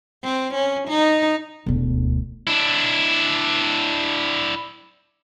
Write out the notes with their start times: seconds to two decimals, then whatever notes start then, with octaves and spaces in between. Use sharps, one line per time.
0.24 C4
0.54 C#4
0.89 D#4
1.66 E1 D2
2.47 D4 E4